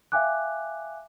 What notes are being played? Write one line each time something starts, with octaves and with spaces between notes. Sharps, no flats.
E5 F5 G5 G#5 D6 F#6